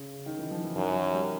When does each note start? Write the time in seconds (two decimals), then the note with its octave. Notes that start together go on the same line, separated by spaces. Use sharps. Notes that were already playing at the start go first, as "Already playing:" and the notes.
Already playing: C#3
0.26 D#3
0.39 E3
0.51 F3
0.64 E3
0.76 F#2 D#3
0.88 F3
1.14 G3